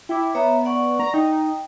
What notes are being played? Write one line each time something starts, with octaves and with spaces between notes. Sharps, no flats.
E4 G5 D6
B3 C#5 E5 A#5
D5 F#5 C#6
A#5
D#4 G5